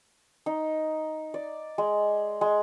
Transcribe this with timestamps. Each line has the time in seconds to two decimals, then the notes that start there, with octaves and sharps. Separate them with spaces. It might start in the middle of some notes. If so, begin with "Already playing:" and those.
0.46 D#4
1.34 D5
1.78 G#3
2.41 G#3